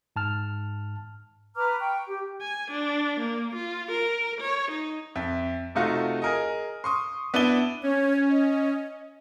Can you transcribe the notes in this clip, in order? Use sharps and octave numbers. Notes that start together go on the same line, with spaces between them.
G#2 A5 F6
B4 A#5 D6 F6
G5 C#6
G4
G#5
D4
A#3
F4
A#4
C#5
D#4
F2 E5
C3 A3 D#4 F4 F#4
G#4 A#4 D#5
C6 C#6 D#6
B3 D4 E4 A5 D#7 G7
C#4 C#5
D#5